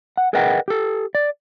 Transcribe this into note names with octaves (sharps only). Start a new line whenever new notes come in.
F#5
G#4 A#4 B4 D#5 F#5 G5
G4 A4
D5